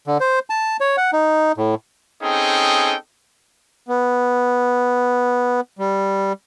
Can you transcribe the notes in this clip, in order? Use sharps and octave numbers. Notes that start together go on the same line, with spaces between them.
D3
C5
A5
C#5
F#5
D#4
A2
C4 C#4 D#4 G#4 A4 G5
B3
G3